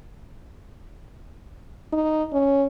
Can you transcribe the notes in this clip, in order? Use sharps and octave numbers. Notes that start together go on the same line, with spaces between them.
D#4
C#4